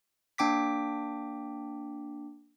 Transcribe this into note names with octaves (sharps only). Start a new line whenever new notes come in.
A#3 D4 G5 D6 B6